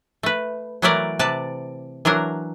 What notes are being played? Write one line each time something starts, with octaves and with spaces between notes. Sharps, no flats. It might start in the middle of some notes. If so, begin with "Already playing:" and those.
A3 B4
E3 F#3 A3 E4 A#4 D5
C3 B4 D5 A5
E3 F#3 D4 A#4